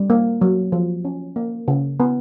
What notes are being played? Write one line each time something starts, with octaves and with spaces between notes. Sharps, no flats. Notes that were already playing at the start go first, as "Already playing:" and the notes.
Already playing: G3
A#3
F#3
F3
C#4
A#3
C#3
B3